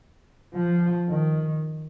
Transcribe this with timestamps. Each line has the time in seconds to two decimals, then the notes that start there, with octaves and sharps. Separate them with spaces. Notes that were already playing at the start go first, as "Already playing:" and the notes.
0.54 F3
1.08 D#3